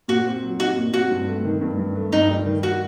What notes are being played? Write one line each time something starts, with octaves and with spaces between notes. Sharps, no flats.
A#2 F#4
C4
F#3
D#4 F#4
A#2
C4 F#4
G2
A3
D#3
G2
G2
A3
G2 D#4
G3
D#3
F#4